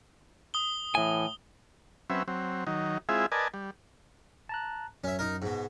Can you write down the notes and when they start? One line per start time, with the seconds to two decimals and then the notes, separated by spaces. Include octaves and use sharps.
0.54 D#6 G7
0.95 A2 E3 G#5
2.10 F#3 C4 C#4 B4 E5
2.28 F#3 C4
2.67 D#3 F#3 D#4
3.09 G#3 C4 E4 F4 G#4 E5
3.32 A#4 B4 D5 D#5 G#5 A5
3.54 G3
4.49 A5 A#5 F#6
5.04 F#2 C#4 E5
5.19 D#4 A#4
5.42 G#2 B2